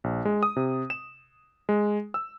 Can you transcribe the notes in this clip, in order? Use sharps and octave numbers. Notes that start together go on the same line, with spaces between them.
A#1
G#3
D#6
C3
E7
G#3
E6